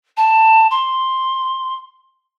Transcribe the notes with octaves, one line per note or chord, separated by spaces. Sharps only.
A5
C6